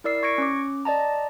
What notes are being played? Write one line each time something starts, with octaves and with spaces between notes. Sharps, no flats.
E4 A#4 D5 E6 C7
C#6 G#6 A#6 C#7 D7
C#4 D6
D5 D#5 A5 A#5